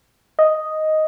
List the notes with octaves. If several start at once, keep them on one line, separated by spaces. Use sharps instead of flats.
D#5